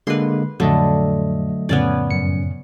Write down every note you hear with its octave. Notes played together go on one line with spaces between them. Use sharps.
D3 G#3 A#3 B4 C6
F2 A2 D3 F#3 A3 D#5
F2 A2 C#3 B3 C#4 D5
F#2 C#7